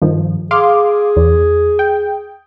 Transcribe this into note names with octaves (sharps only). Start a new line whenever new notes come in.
G2 D#3 F3
G#4 F5 C6 D6
E2
G5